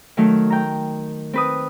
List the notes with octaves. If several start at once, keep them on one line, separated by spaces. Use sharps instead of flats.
D#3 F#3 A3 D#4 A#4
G5 A#5
C4 B4 D#6